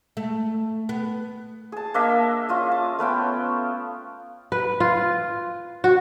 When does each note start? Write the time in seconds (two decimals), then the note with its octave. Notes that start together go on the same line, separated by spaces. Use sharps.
0.17 A3
0.89 B3
1.72 G#4 A5
1.94 A#3 D4 D#5 E5
2.49 C#4 F4 D#5 E5
2.71 A5
2.99 A3 B3 C#4 G5
4.52 B4
4.80 F4
5.84 F#4